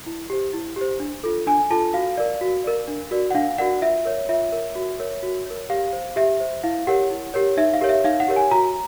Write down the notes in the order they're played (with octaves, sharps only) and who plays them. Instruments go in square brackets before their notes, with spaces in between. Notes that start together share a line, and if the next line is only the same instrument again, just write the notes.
[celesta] E4
G4 C5
E4
G4
C5
D4
F4 A4
D4 G#5
F4 A4 A5
F#4 F5
A#4 D5
F#4
A#4 D5
D4
F#4 A#4 D5
F#5
D4 F5
F#4 A#4 D5 F#5
F4 E5
A#4 C#5
F4 E5
A#4 C#5
F#4
A#4 C#5
F#4
A#4 C#5
G4 F5
C5
G4 E5
C5
E4 F5
G4 A#4 C#5 F#5
E4
G4 A#4 C#5
D#4 E5
F5
G4 A#4 C#5
E5
D#4 F5
F#5
G4 A#4 C#5
G#5
F#4 A#5